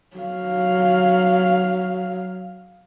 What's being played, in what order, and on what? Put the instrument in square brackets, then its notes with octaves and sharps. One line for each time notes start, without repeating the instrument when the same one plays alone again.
[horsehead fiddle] F#3 F5